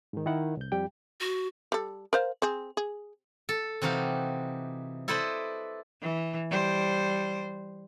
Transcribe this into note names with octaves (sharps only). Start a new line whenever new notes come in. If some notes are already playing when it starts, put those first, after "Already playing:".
G#2 D#3
D#3 E4 F#5
C2 G6
F2 G3 G4 G5
F#4
G3 A4
A#4 C5 F5
C4 G#4
G#4
A4
C3 E3 D#4 F#4 G4 F5
E4 A4 B4 C5 D5 D#5
E3
G3 C5